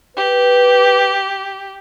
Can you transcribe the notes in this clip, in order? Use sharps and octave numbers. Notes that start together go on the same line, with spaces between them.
G4 B4